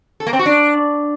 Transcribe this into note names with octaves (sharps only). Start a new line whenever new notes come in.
A4
A#3
C4
F#4
D4